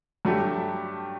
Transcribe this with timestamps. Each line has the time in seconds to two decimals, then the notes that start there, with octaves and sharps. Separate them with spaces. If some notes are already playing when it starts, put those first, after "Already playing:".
0.25 G2 F#3 A3 D4 G4